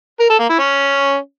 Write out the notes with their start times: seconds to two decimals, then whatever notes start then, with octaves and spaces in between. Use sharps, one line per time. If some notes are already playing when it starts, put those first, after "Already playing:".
0.20 A#4
0.30 A4
0.39 A#3
0.49 E4
0.59 C#4